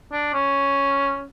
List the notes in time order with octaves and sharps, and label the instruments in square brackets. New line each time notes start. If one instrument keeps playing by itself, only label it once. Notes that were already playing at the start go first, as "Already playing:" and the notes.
[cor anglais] D4
C#4